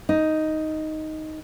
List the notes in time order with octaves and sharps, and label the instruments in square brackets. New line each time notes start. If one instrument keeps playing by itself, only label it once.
[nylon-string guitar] D#4